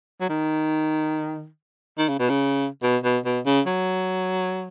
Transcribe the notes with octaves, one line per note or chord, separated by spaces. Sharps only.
F#3
D#3
D#3
C#3
B2
C#3
B2
B2
B2
C#3
F#3